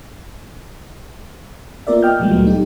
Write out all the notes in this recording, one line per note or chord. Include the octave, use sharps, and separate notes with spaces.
A#3 B3 F4 A#4 D5 E5
D#5 G5 F6 G6
A#2 F3 G3 G#3 A#3
D2 F#3 G3 A3 B3
D#4 G4